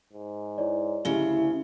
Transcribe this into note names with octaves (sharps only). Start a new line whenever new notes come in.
G#2
E4 C#5 D5
D2 C#3 E4 G4 G7